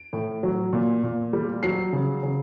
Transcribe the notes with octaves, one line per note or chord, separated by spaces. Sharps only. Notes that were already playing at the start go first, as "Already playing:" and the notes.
Already playing: D7
A2
F#3
A#2
A#2
G3
F#3 C7
C#3
C#3